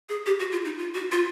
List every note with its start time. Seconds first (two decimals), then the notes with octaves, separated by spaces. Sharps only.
0.09 G#4
0.26 G4
0.40 F#4
0.52 F4
0.65 D#4
0.78 F4
0.94 F#4
1.12 F4